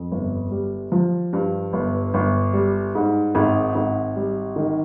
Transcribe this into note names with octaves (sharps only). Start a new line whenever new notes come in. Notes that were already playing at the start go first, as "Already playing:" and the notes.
Already playing: F2
G1
G3
F3
G2
G1
G1
G3
G#2
G#1
G#1
G3
D#3